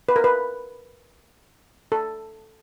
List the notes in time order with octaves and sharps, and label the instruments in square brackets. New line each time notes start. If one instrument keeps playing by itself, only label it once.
[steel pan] B4
A#4
B4
A4